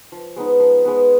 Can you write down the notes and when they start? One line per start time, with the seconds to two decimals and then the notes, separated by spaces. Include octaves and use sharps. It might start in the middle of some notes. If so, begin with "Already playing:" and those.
0.12 F3
0.36 G#3 B3 D#4
0.59 F3
0.83 G#3 B3 D#4